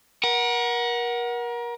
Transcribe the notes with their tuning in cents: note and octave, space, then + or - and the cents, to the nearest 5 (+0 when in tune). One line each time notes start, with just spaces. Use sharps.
A#4 +35 F#5 +0